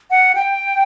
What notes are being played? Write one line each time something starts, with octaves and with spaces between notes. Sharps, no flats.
F#5
G5